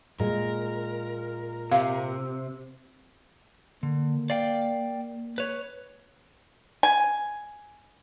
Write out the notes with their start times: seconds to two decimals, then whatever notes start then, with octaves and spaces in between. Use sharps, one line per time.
0.20 A#2 G#3 A#4
1.71 C3 F5
3.83 D3 A#3
4.30 D5 F5 G5
5.38 B4 C#5
6.83 G#5